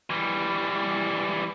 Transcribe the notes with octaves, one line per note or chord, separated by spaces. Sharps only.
E3 G3